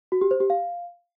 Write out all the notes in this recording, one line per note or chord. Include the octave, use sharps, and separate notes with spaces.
F#4
G4
C5
G4
F5